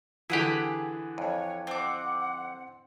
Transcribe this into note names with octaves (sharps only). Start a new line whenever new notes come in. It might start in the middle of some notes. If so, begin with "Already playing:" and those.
D3 E3 E4 G4 G#4 F#5 B5
F2 C#5
C4 F#5 D6